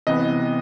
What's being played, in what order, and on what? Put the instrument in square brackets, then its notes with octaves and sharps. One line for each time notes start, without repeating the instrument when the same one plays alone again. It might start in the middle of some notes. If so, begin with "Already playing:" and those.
[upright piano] C3 E3 B3 D#5